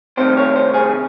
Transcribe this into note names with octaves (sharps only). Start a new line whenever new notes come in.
C2 C3 D#3 A3 C4 C5
C#5
C5
G#4